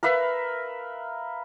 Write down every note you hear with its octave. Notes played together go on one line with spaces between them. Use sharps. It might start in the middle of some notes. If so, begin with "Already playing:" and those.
A#4 B4 E5 F5